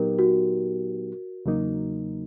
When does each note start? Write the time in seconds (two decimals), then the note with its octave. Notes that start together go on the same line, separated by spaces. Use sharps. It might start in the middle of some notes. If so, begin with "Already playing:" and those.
Already playing: A#2 F#3 B3 D#4 G4 A#4
0.19 F#4
1.45 E2 C#3 F#3 A#3 D#4